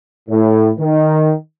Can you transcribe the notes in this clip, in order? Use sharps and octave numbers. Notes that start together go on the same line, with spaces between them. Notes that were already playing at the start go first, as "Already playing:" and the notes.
A2
D#3